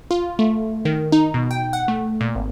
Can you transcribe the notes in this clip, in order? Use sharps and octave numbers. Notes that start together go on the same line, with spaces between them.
F4
A3
D#3
D#4
B2
G5
F#5
A3
A#2
G#1